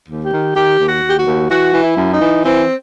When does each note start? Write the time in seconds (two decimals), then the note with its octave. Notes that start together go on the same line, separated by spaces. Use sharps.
0.09 D#2
0.25 G4
0.33 D#3
0.56 D#3 G4
0.79 D#2
0.87 F#4
1.03 D#2
1.09 G4
1.19 F#4
1.27 D#2
1.50 E3 F#4
1.74 E3
1.82 E4
1.97 F#2
2.13 D#4
2.21 E3
2.45 E3 C4